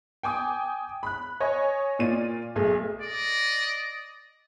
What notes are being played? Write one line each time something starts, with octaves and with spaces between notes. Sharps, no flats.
G5 G#5 D6 D#6
B5 F#6
C#5 D#5 G#5
A#2 F4 D5 D#7
B1 A3 G#4
D5 D#5